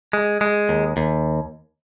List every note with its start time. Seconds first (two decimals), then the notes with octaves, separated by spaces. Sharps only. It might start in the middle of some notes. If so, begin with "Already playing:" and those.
0.13 G#3
0.41 G#3
0.69 D#2
0.97 D#2